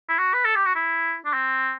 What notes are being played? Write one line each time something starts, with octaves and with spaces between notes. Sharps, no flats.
E4
F#4
B4
A4
G4
F#4
E4
D4
C4